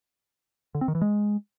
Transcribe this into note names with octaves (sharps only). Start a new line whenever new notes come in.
D3
C4
D#3
E3
G#3